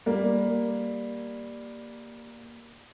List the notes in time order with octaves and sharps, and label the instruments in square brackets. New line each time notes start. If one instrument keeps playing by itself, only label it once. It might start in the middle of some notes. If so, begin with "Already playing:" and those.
[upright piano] G3 A#3